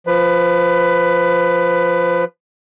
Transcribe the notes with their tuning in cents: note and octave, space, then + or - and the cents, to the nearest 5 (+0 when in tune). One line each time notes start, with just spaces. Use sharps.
F3 +0 B4 +15